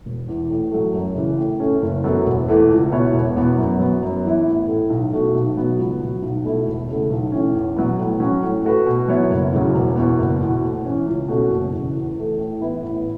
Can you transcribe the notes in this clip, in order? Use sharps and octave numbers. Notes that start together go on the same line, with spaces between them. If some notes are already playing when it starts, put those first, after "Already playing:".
E1
E2 E3
A2
F#3 A3
F#2
C#3 E3
A2
A3 C#4
F#1
F#2 F#3 B3 A4
E1
E2 E3 A3
C#2
B2 B3 E4 C#5
E1
E2 B2 B3
F#2
F#3 B3
F#2
E3 B3 E4
A1
A2 A3
B1
B2 A3 F#4
B1
B2 F#3 B3 F#4
C#2
B2 F#3
B1
B2 A3 E4
E1
E2 C#3 A3
B1
A2 E3 C#4
E2
B2 F#3 B3
A2
F#3 C#4 F#4
A2
A3 F#4 B4
B2
F#3 B3 E4 C#5
F#1
E2 C#3 F#3
E1
E2 B2 B3
F#1
E2 B2
A2
E3 C#4
C#2
B2 A3 C#4 F#4
F#1
E2 C#3
E2
E3 A3
A2
E3 B3 E4 B4
A1